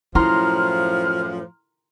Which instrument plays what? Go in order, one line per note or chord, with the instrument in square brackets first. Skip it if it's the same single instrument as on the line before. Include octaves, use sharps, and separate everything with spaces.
[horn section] F#2 A2 F3 [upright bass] E4 [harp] A#5 C6 [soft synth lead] F6